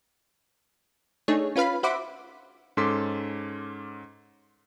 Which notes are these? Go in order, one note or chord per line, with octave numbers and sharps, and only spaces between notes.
A3 D4 D#4 G#4 C#5
C#4 F4 B4 F5 B5
F#4 C5 E5 F#5 B5 D6
G#2 C#4 A4 C6 D6 B6